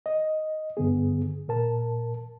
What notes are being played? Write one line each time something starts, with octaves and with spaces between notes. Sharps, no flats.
D#5
G2 D3 B3 G#4
A#2 A#4 A5